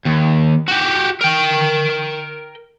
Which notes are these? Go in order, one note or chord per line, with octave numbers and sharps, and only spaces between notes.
D#2
F#4 G4
A#4 G5